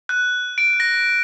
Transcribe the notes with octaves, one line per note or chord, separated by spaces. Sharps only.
F#6
D7
A#6